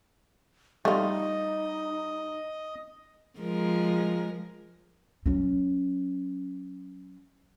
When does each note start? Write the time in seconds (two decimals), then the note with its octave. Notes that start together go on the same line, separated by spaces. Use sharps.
0.85 G3 A3 D#4 F4 D#5
3.40 F3 G#3 A#4
5.26 F#3 C#4